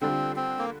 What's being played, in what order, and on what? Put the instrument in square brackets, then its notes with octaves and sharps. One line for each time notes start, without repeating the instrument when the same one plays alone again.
[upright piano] D3 G3 D4 F4 [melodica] C4
[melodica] C4
A#3